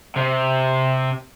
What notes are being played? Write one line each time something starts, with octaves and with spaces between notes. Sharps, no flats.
C3